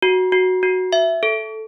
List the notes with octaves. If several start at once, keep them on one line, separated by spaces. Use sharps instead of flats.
F#4
F#4
F#4
E5
A4